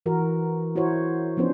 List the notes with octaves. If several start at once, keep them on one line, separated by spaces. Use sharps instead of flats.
E3 F#4 A#4
E4 F#4 A#4 C5 C#5
F3 B3 C#4 D4 C5